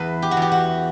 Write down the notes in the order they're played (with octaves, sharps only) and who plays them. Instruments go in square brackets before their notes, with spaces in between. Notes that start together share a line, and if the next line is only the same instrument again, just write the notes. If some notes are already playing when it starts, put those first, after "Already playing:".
Already playing: [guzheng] E2 B4
G4
F#4
E2 G4
F#4